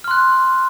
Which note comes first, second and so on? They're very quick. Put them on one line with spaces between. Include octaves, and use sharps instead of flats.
F6 C6 F#6